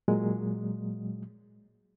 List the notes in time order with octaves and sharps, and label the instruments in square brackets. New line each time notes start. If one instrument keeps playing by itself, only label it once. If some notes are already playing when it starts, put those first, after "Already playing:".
[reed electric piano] A#2 F#3 G#3